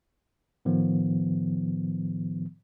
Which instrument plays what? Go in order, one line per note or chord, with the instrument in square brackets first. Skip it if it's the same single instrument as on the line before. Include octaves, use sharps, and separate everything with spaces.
[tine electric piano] A2 D#3 F3 B3